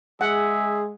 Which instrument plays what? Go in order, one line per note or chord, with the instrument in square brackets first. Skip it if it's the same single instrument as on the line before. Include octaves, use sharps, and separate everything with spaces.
[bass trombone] G#3 [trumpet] G#4 [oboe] E5 [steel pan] F#5